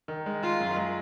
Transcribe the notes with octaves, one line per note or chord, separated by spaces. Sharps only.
D#3
G#3
D#3 F4
F#2
G#3